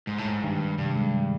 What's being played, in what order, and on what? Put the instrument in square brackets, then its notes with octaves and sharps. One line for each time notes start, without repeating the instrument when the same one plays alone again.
[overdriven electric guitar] G#2 [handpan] G#3
[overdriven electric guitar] A2
[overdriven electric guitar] G#2 [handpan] G#3
[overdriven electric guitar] G2 [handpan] D#3
[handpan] G#3
[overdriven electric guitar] G2 [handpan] C3
[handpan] G#3
D#3